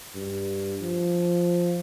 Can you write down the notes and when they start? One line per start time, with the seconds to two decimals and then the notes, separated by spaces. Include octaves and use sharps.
0.15 G2
0.81 F3